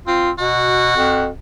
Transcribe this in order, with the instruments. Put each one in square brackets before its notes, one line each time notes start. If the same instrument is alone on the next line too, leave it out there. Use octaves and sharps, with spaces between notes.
[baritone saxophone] C4 [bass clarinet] F4
[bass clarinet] B2 [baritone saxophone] F#4
[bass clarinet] F2